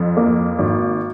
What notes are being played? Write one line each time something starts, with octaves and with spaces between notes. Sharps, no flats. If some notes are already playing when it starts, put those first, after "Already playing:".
Already playing: F2
A#3
G#1